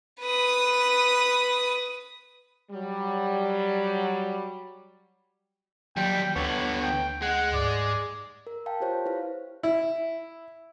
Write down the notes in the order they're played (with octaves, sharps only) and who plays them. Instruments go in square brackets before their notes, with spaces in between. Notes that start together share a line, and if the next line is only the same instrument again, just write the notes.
[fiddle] B4 D#6
[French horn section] F#3 G3
[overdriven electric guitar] D#2 G3 [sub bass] F#3 [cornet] G5
[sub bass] D2 [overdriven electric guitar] D3 B3 [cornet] C#5
[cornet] G5
[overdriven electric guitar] G#3 [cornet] F#5
[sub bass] G#2 [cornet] D5
[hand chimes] A#4
F5 G5 A5
F4 G4 C5 C#5
E4 B4 F5
[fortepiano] E4